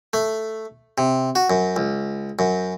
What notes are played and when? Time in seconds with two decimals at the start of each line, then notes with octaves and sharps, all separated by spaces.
0.13 A3
0.98 C3
1.35 F#4
1.50 F#2
1.76 C#2
2.39 F#2